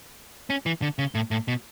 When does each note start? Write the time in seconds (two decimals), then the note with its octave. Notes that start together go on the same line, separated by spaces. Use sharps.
0.50 C#4
0.66 E3
0.82 D3
0.99 C#3
1.15 A2
1.31 A2
1.48 B2